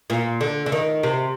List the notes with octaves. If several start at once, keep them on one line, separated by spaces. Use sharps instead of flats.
A#2
D3
D3
D#3
C3